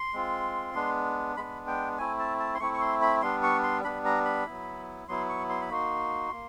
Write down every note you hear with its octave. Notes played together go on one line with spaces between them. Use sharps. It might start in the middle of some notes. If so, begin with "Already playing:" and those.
Already playing: C6
G#3 C4 F4
G#3 B3 D4
G#3 B3 D4 B5
G5
A3 C4 E4 G#5
A5
A5
C6
A3 C4 E4 C#6
C#6
C6
B5
G3 B3 D4 C6
C#6
C6
G3 B3 D4 B5
A#5
B5
F#3 B3 E4
F#3 B3 E4 C6
C#6
C6
B5
A#3 D#4 F#4 C6
A#3